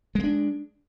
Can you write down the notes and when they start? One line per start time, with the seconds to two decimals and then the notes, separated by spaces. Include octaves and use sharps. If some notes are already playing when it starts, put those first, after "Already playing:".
0.15 G#3
0.19 A#3
0.24 D4